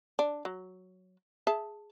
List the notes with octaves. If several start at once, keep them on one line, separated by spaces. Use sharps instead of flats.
D4
F#3
G#4 E5 A5